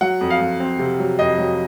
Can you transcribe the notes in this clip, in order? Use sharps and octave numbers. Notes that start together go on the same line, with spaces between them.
F#3 F#5
F2
F5
F2
C4
C3
F#3
F2 D#5
F#3